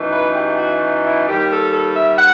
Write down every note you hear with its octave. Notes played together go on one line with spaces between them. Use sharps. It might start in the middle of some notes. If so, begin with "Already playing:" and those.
Already playing: F#2 E3 A3 D#4
B4
G4
F#4
E4
D#2 D#3 G3 G4
A4
A4
E5
F#5